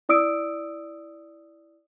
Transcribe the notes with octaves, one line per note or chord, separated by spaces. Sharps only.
E4 D5 D#6 E6 D7